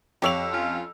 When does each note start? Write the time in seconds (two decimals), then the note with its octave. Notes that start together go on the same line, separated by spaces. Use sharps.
0.22 F2 G4 C#5 F5 E6 F7
0.51 C#4 F4